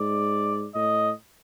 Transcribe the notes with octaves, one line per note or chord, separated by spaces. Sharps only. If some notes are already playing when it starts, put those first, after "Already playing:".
Already playing: G#2 D5
A2 D#5